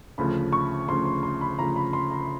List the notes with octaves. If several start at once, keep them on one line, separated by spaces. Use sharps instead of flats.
D2 C#3 F3 B5
C#6
D2 C#3 F3 C6
C6
C6
B5
D2 C#3 F3 A#5
B5
C6
A#5